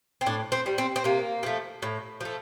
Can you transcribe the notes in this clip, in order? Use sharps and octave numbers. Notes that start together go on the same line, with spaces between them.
C4
A2 D4
C4
G3
C4
C4
C3 A#3
F3 A3
A2
F3 A3